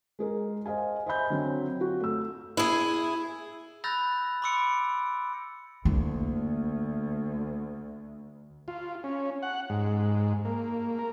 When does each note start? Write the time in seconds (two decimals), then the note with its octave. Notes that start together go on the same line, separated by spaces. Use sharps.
0.19 G#3 G#4 A#4
0.66 C5 D#5 F5 G#5
1.06 C5 D#5 E5 G#5 B5 G6
1.30 D3 F#3 C4
1.80 F4 F#4
2.00 A3 E6
2.57 E4 G#4
3.84 B5 E6 F#6 G6 A6 A#6
4.42 B5 C6 D6 E6 C#7 D7
5.85 D2 A#3 E4
8.68 F4
9.04 C#4
9.43 F#5
9.70 G#2
10.45 A#3
10.99 A#4